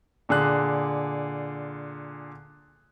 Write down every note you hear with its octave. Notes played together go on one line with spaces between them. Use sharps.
A#2 D3 G#4 F#6